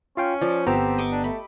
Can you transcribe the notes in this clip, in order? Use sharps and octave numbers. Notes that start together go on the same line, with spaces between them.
C#4 F4 F5 G5
F3 D5
G1 B3 C4 G4 A4 A#5
D#5 C#6 D6
D4
A3 B5